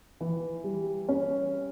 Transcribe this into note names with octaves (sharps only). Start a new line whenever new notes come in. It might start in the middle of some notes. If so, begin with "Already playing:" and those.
E3
G3
C#4